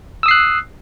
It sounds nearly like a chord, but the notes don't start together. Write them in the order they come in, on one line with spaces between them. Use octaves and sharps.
E6 D#6 C7 F#6